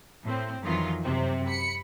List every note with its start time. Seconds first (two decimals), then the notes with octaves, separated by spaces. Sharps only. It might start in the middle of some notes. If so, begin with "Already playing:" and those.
0.24 A2 C4
0.62 F2 D#3 E3 F#3 F4
1.04 F#2 C3 C4
1.46 B5 C#7